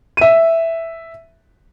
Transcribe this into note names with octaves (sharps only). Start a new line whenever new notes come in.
E5 D#7